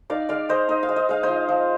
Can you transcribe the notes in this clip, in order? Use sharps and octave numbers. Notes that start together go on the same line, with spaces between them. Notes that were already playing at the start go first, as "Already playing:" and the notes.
D#4 D5 F5
G#3 D5 F5
G#3 C5 D#5
D#4 D#5
F5
G#3
D#5
G#3 F5
C5 D#5
F3
F3